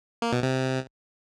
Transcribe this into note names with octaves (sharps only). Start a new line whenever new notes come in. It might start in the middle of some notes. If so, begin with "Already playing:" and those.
A#3
B2
C3